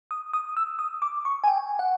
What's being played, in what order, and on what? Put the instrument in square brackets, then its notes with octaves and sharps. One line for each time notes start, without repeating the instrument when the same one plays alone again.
[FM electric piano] D#6
D#6
E6
D#6
D6
C#6
G#5
G5
F#5